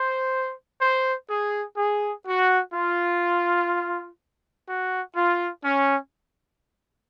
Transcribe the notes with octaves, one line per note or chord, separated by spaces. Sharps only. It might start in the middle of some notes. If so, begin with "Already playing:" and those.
Already playing: C5
C5
G#4
G#4
F#4
F4
F#4
F4
C#4